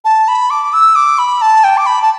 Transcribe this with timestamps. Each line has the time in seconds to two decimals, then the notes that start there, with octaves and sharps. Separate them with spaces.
0.05 A5
0.28 B5
0.50 D6
0.73 E6
0.95 D6
1.18 B5
1.42 A5
1.64 G5
1.77 D6
1.86 B5
2.02 A5